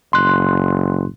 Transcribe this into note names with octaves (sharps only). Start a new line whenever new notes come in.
F#1 C6 F#6